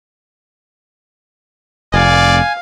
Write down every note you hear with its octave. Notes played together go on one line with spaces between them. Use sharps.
F1 D5 F5 G#5